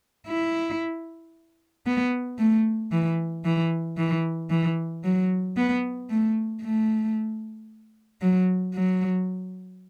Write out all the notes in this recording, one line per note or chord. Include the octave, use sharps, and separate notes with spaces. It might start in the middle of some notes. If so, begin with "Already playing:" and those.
E4
B3
A3
E3
E3
E3
E3
F#3
B3
A3
A3
F#3
F#3